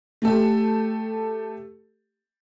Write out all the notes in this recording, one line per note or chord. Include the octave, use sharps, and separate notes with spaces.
A3 G4 A4